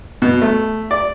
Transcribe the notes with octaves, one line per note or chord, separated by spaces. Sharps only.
B2
A3
D5